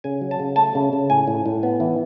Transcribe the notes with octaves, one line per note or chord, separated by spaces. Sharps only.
C#3 G#5
F#3
A5
C#3
A3 A5
C#3
C#3
A2 G#5
A2
A2
B3
E3